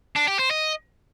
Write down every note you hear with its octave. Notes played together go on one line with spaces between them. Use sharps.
D4
G4
C5
D#5